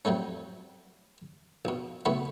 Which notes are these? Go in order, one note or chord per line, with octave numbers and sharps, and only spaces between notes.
F2 F#3 G3 A3 C#4
A#1 B2
B1 C#3 A3 B3 F#4 B5